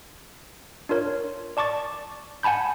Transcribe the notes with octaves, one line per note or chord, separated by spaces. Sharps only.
D4 F4 A#4 C#5
D5 A5 C#6 D6 A6
F#5 G#5 A5 B5 G6